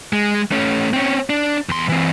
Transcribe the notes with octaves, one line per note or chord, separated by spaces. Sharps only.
G#3
A3 C#4
C4 C#4
D4
E2 C6
E3 C4